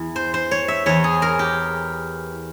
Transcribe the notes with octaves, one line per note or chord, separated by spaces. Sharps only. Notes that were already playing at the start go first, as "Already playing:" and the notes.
Already playing: E2 E3
C5
C5
C#5
E5
E2 E3 C#5
G#4
A#4
G4